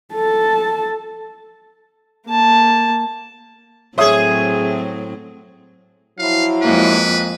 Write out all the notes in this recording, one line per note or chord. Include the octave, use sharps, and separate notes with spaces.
A4 A5
A#3 A5
A2 F#3 C4 G#4 C5 C#5 E5 D#6
F3 F#3 E4 F5
F2 G#3 A#3 B4